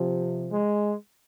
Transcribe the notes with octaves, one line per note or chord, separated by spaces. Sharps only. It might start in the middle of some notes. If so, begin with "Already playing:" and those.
Already playing: C3 F3
G#3